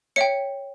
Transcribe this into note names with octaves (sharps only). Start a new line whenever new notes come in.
C#5 E5 G5 C#7